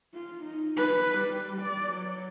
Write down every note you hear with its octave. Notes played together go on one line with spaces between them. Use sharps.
F4
D#4
B4
G3
D5
F#3